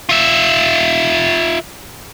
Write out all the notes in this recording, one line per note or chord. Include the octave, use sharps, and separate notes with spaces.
F4 E5